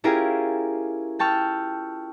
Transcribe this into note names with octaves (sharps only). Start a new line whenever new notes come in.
C#4 E4 F4 G4 G#4 A#4
G5 A5 C#6 E6 F6